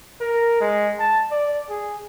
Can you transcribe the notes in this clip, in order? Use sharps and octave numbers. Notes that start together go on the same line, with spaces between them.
A#4
G#3
A5
D5
G#4